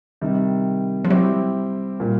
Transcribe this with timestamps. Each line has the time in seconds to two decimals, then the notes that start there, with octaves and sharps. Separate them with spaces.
0.21 C3 D#3 G3
1.05 F3
1.10 F#3 G3 C4 E4 G4
2.00 A#2 G3 A#3